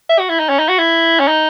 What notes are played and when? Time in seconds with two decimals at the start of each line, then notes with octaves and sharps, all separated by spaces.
0.09 E5
0.19 F#4
0.29 E4
0.39 D#4
0.49 C#4
0.59 D#4
0.69 F#4
0.79 E4
1.19 C#4
1.28 D#4